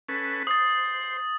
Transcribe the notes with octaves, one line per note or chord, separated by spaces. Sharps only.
C#4 A4 B4
C5 D#6 A6